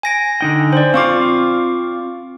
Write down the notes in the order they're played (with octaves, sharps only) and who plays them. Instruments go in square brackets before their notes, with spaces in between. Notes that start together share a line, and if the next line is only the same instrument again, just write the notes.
[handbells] G#5 A#6 D7
[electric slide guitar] D3 D#4 G5
[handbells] C5 D5
[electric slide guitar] C4 F4 [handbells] F5 C#6 D6